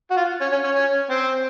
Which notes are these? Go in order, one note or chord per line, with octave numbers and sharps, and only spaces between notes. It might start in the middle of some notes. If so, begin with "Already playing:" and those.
F#4
F4
C#4
C#4
C#4
C#4
C4